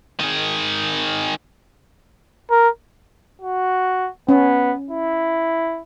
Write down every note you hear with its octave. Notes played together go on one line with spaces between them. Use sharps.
D#3 G#4
A#4
F#4
B3 C#4
E4